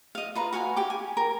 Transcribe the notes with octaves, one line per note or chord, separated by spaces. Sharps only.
D#5 F5
F4 B4 A#5
F#4 F5 F#5 G#5
G4 G5 D6
G#5
A#4